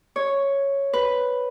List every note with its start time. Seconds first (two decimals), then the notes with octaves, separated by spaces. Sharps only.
0.16 C#5
0.93 B4